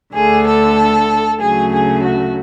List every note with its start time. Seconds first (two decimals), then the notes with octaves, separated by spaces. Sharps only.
0.14 D2 D3 A3 G#4
0.46 A4
1.40 D2 C#3 F#3 A3 G#4
1.71 G#4
2.02 F#4